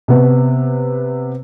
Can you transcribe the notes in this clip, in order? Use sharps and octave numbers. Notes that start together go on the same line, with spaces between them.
C3 B3